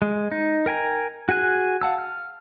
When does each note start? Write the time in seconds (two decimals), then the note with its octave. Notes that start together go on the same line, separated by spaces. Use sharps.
0.02 G#3
0.32 D#4
0.66 A#4 G5 G#5 A#5
1.29 F#4 G#4 G#5 F#6
1.81 F5 F#5 A5 E6
1.98 F6